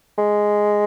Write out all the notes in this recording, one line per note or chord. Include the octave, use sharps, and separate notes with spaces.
G#3